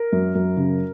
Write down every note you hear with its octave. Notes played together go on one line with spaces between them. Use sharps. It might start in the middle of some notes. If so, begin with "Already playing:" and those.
Already playing: A#4
F#2
F#2
C#3